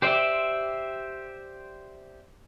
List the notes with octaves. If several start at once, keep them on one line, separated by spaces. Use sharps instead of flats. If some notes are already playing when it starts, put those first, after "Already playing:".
G4 C5 D5 E5 G5